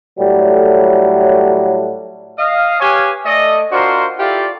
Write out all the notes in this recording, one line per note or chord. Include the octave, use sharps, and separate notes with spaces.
A2 F#3 G3 A3
D#5 F5
G4 B4 C#5 F5 G#5
A3 A4 D5 D#5
D4 F4 F#4 A#4 C5
E4 F4 G4 A4 D5 F5